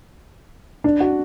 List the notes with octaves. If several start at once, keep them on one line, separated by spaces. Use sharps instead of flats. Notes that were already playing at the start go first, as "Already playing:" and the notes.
D4
F#4